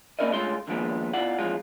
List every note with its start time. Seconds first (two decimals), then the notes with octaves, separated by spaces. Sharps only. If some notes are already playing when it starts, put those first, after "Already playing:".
0.19 A#3 C#4 E4 A#4 D5 D#5
0.32 D2 G#3 A3 C#4 F4 C6
0.67 D3 D#3 F3 G#3 A#3 B3
1.13 B2 E4 F4 D5 F#5
1.39 F2 E3 F3 G#3 F4